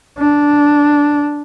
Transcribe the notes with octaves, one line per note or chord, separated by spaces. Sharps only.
D4